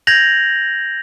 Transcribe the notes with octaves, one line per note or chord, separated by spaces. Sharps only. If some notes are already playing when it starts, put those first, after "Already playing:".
G6 G#6 A#6 F7 F#7